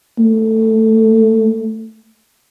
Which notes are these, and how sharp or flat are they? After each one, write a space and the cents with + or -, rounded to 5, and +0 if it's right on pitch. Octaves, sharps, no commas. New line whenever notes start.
A3 +10